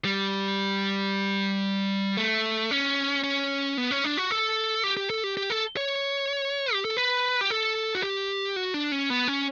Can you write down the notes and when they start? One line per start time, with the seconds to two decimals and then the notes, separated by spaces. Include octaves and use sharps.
0.05 G3
2.17 A3
2.71 C#4
3.24 C#4
3.78 B3
3.91 C#4
4.04 D4
4.17 F#4
4.31 A4
4.84 G4
4.97 G4
5.10 A4
5.24 G4
5.37 G4
5.50 A4
5.77 C#5
6.73 G4
6.85 A4
6.97 B4
7.41 G4
7.50 A4
7.95 F#4
8.03 G4
8.56 F#4
8.74 D4
8.92 C#4
9.10 B3
9.28 C#4